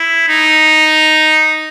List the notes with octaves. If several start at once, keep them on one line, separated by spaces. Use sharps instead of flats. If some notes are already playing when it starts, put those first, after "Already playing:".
Already playing: E4
D#4